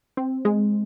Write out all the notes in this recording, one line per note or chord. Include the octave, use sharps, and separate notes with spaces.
C4
G#3